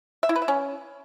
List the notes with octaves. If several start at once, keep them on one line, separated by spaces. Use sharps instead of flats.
E5
E4
B4
E5
C#4